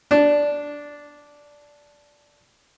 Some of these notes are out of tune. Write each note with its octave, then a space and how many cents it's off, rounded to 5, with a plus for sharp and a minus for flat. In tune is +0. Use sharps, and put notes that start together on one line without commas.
D4 -10